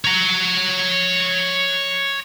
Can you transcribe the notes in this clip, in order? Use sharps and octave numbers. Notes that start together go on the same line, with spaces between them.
C#5 A#5